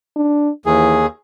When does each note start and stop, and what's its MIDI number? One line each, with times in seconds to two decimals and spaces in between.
0.16 0.50 62
0.66 1.06 39
0.66 1.00 52
0.66 1.06 68